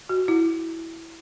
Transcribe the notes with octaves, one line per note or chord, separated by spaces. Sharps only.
F#4
E4